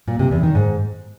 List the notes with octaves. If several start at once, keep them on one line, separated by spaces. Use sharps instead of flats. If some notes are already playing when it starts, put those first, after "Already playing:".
A#2
C3
E2
D#3
G#2